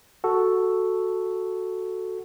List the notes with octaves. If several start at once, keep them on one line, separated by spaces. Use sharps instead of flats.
F#4 A4